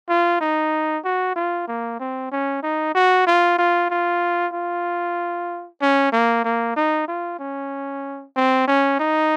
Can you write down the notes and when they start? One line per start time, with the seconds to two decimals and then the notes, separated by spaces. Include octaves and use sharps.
0.09 F4
0.41 D#4
1.04 F#4
1.36 F4
1.68 A#3
2.00 C4
2.32 C#4
2.63 D#4
2.94 F#4
3.27 F4
3.59 F4
3.90 F4
4.53 F4
5.82 C#4
6.13 A#3
6.44 A#3
6.76 D#4
7.08 F4
7.39 C#4
8.36 C4
8.68 C#4
9.00 D#4